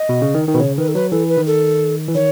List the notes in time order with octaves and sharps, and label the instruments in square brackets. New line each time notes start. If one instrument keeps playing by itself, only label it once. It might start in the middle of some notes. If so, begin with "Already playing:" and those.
Already playing: [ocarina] D#5
[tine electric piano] B2
C#3
D#3
D#3
[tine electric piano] B2 [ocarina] B4
[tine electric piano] C#3 [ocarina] C#5
[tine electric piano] D#3 [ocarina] B4
[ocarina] A4
[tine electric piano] F#3 [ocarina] B4
[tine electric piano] E3 [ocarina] A4
[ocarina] B4
[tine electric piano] D#3
[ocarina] A4
[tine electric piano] E3
[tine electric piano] D#3 [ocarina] C#5